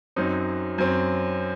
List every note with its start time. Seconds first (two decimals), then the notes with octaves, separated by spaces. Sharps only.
0.16 F#2 F#3 C4 D#4
0.78 F#2 F#3 C4